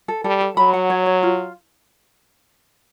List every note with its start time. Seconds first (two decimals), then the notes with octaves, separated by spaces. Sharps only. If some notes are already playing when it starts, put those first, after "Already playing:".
0.08 A4
0.24 G3 A4
0.41 A4
0.57 F#3 B5
0.73 F#5
0.90 C#5
1.06 C#5
1.23 F4